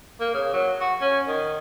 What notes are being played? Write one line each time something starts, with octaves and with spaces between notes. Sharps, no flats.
A#3
C#3
F#3
F#4
C#4
D#3